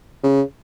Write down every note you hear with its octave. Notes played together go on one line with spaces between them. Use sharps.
C#3